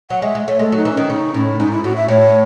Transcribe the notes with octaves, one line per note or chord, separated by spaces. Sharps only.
F#3 F#5
G#3 E5
G#3
A3 C#5
G#3 A4
F#3 D#4
E3
D#3 C#4
C#3 D#4
A2 C#4
G#2 D#4
E4
A2 F#4
E5
A2 C#5